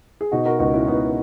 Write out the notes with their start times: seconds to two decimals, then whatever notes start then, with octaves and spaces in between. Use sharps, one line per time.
0.21 G#4
0.32 B2 D#4 F#4
0.45 F#4 A#4
0.59 C#2 D#4 F#4
0.74 C#4 E4
0.88 C#2 B3 D#4